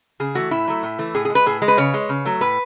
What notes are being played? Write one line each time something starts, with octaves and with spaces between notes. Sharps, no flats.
C#3 G#4
E3 A3 F#4
A2 E4
F#3 A3
A2
E3 A3
A2 G#4
G#4
G#3
B4
A2 G#4
G#3
B4
C#3 C#5
G#3
C#3
F#3 A3
A2 B4